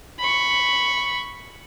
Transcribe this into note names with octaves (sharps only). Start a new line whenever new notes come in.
B5 C#6